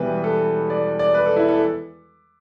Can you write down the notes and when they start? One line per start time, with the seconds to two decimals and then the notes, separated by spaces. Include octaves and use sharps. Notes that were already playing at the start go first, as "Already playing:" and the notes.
Already playing: E1 E2 E3 G3 B4
0.24 A4
0.70 D5
0.99 D5
1.14 B4
1.26 A4
1.36 E4
1.49 A4